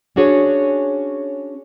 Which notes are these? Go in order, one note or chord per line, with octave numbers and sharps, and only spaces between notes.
C#4 D4 F#4 G#4 C#5